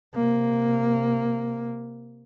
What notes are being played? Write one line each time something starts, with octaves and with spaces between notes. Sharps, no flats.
C3 A#3